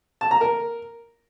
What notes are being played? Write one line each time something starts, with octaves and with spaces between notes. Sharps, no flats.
A5
A#5
A#4